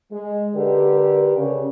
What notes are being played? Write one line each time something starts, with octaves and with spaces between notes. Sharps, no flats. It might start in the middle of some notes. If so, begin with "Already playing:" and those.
G#3
D3 G4 A#4 B4 D5
C#3